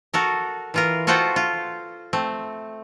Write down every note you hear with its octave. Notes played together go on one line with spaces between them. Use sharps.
F#4 A4 A#4
E3 F4 A#4
F4 F#4 A4 C5 F#5 G5
F4
A3 C4